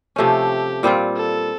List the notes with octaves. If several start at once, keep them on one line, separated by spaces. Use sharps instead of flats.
C3 F3 A3 C#4 G4
A#2 G3 C4 F4
A4